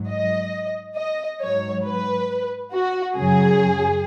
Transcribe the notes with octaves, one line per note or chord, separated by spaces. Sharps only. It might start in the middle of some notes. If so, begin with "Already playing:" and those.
Already playing: G#2 F#3
D#5
D#5
G#2 F#3 C#5
B4
F#4
F#2 C#3 F#3 G#4